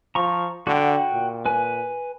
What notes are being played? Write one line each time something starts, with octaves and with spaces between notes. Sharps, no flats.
F3 A#5 C#6
D3 F#4 G5
A#2
B4 G#5